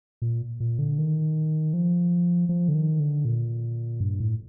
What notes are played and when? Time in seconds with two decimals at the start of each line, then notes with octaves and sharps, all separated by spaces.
0.22 A#2
0.60 A#2
0.78 D3
0.98 D#3
1.73 F3
2.49 F3
2.68 D3
2.74 D#3
3.00 D3
3.25 A#2
4.00 G2
4.20 A2